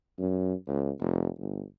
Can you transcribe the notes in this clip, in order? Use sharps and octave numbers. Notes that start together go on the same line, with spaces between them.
F#2
C#2
F1
G1